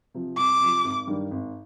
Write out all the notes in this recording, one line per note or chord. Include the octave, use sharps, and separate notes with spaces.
C3 F3
C2 D6
C3 F3
G#1
G2 D#3 G3
G#1